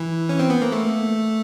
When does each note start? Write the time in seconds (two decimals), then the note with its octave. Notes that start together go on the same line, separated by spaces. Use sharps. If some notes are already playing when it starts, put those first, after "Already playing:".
Already playing: E3
0.29 C#4
0.39 C4
0.50 B3
0.62 A#3
0.72 A3